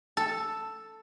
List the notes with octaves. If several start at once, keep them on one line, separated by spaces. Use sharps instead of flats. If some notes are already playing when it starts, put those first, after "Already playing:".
A4